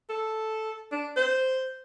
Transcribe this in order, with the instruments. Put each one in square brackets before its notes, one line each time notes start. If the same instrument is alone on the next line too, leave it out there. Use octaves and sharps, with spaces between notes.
[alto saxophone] A4
D4
C5